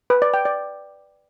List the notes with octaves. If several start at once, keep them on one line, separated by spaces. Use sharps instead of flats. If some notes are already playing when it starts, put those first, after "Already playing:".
B4
D5
G5
D5